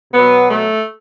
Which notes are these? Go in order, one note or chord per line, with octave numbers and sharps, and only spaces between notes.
B2 F#3 B3
A3